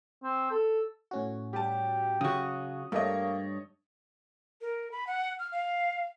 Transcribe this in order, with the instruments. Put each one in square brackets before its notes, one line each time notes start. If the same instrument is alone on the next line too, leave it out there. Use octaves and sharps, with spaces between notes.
[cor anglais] C4
A4
[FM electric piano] A2 C#4 F#4
[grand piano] G3 A5 [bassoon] G4
[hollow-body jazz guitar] C#3 F#4 [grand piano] F#3 [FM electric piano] D#6
[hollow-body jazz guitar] G2 [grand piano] A3 C#5 D#5 [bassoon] A#3
[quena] A#4
B5
F#5
F6
F5